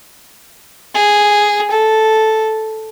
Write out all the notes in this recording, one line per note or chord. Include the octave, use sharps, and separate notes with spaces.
G#4
A4